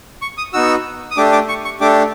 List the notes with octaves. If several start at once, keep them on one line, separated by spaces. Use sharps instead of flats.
C#6
D#6
B3 D#4 F#4 E6
D#6
A3 D4 G4 D6
D6
C#6
C#6
A3 D4 G4 D6